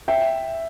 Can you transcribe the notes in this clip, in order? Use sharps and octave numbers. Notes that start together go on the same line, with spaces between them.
E5 G5